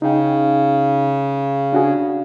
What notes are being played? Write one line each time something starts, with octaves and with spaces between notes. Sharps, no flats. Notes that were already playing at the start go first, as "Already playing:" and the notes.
C#3 D#4 G5
D4 F#4 G#4